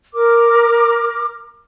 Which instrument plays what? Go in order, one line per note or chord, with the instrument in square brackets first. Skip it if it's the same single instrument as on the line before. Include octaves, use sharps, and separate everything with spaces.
[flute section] A#4 D6